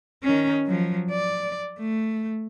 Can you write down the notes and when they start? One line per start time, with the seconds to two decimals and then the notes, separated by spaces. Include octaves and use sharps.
0.24 D#3 C#4
0.66 F3 F#3
1.11 D5
1.79 A3